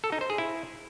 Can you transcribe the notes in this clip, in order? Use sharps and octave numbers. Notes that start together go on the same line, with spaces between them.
A4
D#4
C5
G#4
E4